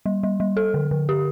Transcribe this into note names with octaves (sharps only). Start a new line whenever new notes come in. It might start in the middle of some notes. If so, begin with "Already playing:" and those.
G3
G3
G3
A4
D3
D3
G4